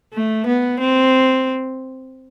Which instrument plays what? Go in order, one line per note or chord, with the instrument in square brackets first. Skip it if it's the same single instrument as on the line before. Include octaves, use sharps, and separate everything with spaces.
[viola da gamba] A3
B3
C4